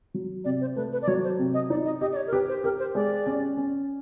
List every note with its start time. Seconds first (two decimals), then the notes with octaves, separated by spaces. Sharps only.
0.14 F#3
0.45 C3 D5
0.61 C5
0.76 A3 B4
0.92 B4
1.02 D5
1.07 F#3 C#5
1.24 C5
1.39 C3
1.54 D#5
1.70 D#4 D5
1.85 D#5
2.01 G4 D#5
2.12 D5
2.16 C#5
2.27 A#4
2.33 G4 B4
2.49 C5
2.64 G4 A#4
2.79 C5
2.95 G#3 D5
3.27 C#4
3.57 C#4